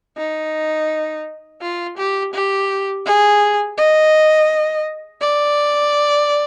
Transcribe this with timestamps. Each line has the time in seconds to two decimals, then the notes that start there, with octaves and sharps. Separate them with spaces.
0.18 D#4
1.62 F4
1.98 G4
2.34 G4
3.06 G#4
3.78 D#5
5.21 D5